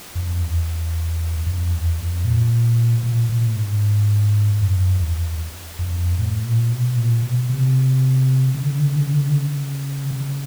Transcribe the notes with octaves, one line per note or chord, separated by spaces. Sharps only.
F2
E2
F2
E2
F2
A#2
A#2
A#2
A2
G#2
F#2
E2
F2
A2
A#2
B2
A#2
B2
C3
C#3
D3
C#3
D3
C#3
D3
C#3
D3
C#3
D3
C#3
C#3